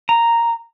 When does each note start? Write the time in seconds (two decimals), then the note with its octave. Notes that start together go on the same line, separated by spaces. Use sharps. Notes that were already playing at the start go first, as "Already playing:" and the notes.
0.09 A#5